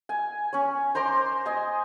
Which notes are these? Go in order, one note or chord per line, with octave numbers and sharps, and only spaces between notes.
G#5
C#4 C#5
C5 A#5 C6 D6
D#5 G#5